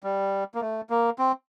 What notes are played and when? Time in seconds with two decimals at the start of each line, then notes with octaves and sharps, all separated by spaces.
0.03 G3
0.54 A#3
0.61 A3
0.90 A#3
1.18 C4